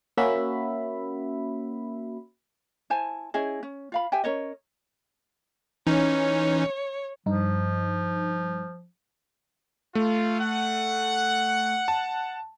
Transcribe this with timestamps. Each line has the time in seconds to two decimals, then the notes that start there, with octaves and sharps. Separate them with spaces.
0.17 A#3 C#4 F#4 E5 B5
2.90 E4 C5 G#5 A5
3.34 C#4 E4 G#4 D#5
3.63 C#4
3.92 F4 F5 B5
4.12 G4 E5 G5 G#5
4.24 C#4 A#4 C#5 D#5
5.87 E3 C#4 D#4 C#5
7.26 G2 F3 D#4
9.95 A3 F4
10.40 F#5
11.88 A5